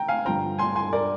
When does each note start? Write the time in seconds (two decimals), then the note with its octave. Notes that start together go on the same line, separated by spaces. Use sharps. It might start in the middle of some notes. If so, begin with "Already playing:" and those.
Already playing: G5 A#5
0.08 F5 G#5
0.25 G2 D3 F3 G5 A#5
0.58 G#5 C6
0.76 G#5 C6
0.93 A#4 D5